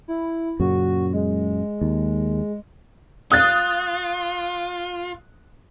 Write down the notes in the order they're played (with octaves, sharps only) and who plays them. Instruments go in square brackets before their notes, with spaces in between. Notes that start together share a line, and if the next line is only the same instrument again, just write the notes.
[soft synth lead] E4
[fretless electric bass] F#2 A#2 C#3 [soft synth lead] F#4
[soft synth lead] G#3
[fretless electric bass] D#2
[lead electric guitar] F4 [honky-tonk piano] D#6 F#6 A6